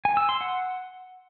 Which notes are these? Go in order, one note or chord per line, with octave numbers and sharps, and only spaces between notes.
G#5
E6
C6
F#5